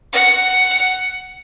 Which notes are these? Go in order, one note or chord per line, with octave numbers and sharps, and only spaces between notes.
F#5